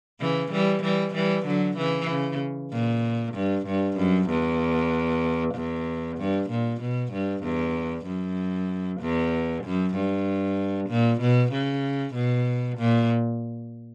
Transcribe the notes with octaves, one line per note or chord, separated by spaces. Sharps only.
C#3 E3
E3 G3
E3 G3
E3 G3
D3 F#3
C#3 E3
C#3
A#2
G2
G2
F#2
E2
E2
G2
A#2
B2
G2
E2
F#2
E2
F#2
G2
A#2
B2
C#3
B2
A#2